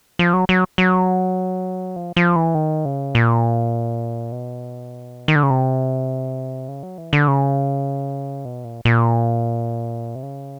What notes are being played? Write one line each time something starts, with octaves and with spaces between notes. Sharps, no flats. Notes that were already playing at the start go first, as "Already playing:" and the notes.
F3
F#3
F#3
F#3
F3
F3
E3
D#3
C#3
A#2
B2
D#3
D3
C#3
C3
C#3
F#3
E3
D3
C#3
B2
A#2
A#2
C3
C#3